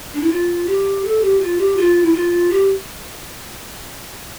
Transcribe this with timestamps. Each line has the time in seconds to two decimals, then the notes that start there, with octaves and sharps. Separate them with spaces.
0.14 D4
0.21 E4
0.30 F4
0.66 G4
1.03 A4
1.21 G4
1.40 F4
1.58 G4
1.77 F4
2.03 E4
2.14 F4
2.50 G4